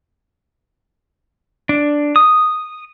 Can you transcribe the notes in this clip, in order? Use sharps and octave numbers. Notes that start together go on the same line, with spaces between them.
D4
D#6